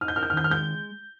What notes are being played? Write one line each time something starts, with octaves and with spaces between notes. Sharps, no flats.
D#4 F6
G6
A#4 F6
G6
F6
D#3 G6
F6
G#3 G6